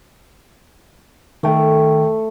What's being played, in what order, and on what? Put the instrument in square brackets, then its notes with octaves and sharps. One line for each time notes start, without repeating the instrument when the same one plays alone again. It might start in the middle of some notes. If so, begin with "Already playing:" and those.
[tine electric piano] D#3 G5 [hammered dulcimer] A3